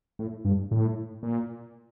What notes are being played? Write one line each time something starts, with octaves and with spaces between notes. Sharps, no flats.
A2
G2
A2
A#2